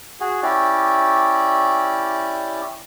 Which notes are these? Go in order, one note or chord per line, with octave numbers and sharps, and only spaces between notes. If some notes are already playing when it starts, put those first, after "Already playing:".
F#4 G#4
C#4 E4 G4 D5